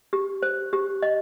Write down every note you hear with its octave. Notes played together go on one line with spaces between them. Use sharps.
G4
C5
G4
D#5